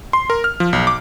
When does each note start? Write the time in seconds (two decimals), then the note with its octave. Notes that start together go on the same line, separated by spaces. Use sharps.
0.13 C6
0.30 A#4
0.44 F6
0.60 F3
0.73 B1
0.87 D6